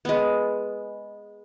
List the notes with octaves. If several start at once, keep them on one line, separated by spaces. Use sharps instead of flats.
G#3 B3